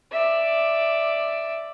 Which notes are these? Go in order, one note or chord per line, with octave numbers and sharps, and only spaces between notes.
D5 E5